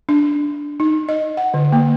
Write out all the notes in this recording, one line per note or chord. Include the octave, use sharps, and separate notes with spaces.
D4
D#4
D#5
F#5
D3
A#3